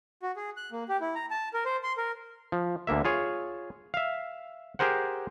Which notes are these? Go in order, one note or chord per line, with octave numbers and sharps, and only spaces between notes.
F#4
G#4
F#6
A#3
G4
E4
A#5
A5
A#4
C5
C6
A#4
F3
D2 D3 A#3 E5
F4 G#4 C#5
E5 F5
G4 G#4 A#4 C5 F#5